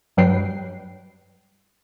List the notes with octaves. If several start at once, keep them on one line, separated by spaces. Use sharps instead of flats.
G2 F#3 G3 B4 G5 C7